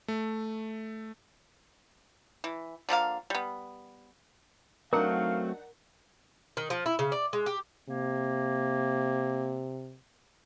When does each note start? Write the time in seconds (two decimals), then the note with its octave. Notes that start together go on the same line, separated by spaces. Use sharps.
0.08 A3
2.44 E3
2.89 D3 F3 A#3 F5
3.30 G3 B3
4.93 F#3 A3 C4 D4 D#4 A#4 F5 F#5
6.57 D#3
6.70 F3
6.86 E4
6.99 C#3
7.12 D5
7.33 G#3
7.46 G4
7.89 C3 A#3